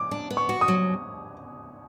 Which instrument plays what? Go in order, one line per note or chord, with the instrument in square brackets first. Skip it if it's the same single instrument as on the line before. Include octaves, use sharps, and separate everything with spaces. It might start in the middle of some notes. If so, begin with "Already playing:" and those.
Already playing: [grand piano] D6
[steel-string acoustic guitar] D4
B3
[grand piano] C#6
[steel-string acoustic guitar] F#4
[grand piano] D#6
[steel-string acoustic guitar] F#3